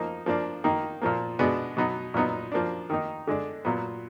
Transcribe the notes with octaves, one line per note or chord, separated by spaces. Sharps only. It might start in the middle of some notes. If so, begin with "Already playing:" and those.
Already playing: F3 A#3 D#4
F3 A#3 D4
D#3 A#3 D#4
A#2 F3 A#3
B2 G#3 B3 D4
B2 F#3 B3 D#4
A#2 F#3 B3 D#4
F3 A#3 D4
D#3 A#3 D#4
D3 G#3 D4
A#2 F#3 B3